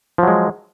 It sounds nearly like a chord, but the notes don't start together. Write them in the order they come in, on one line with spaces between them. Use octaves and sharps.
F3 F#3 G#3